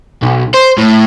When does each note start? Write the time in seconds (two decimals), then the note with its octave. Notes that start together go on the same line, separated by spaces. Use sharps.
0.22 B1
0.54 C5
0.78 A2